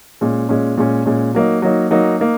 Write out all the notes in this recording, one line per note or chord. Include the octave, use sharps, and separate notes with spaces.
A#2 G#3 C#4
A#2 G#3 C#4
A#2 G#3 C#4
A#2 G#3 C#4
F#3 A#3 D#4
F#3 A#3 D#4
F#3 A#3 D#4
A#3 D#4